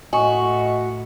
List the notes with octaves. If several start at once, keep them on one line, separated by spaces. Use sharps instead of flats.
A2 F#4 D#5 G#5 C#6